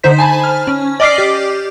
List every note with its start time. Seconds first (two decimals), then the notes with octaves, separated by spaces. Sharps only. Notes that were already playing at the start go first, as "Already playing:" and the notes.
0.03 D3 D#4 C5 B6
0.19 G#5 A5 B5
0.44 F6
0.67 C#4
1.00 D5 D#5 D6 F6 B6 C7
1.18 G4